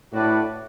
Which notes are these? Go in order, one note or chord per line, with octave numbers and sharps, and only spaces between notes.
A2 D4 F#4 B4 D5 F#5